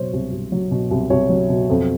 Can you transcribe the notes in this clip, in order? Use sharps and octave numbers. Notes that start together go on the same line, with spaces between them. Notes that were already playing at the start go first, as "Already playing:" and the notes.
Already playing: B2 F#3 C5 C#5
C2
C2
F#3
B2
C2
C2 C#5
F#3
B2
F2